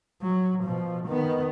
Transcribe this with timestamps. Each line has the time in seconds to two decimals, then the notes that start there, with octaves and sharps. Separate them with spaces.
0.22 F#3
0.63 B2 F3
1.06 D#3 B3